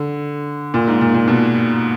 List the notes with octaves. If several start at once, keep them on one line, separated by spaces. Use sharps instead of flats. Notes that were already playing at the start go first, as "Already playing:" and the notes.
Already playing: D3
A#2
G#2
A#2
A#2
B2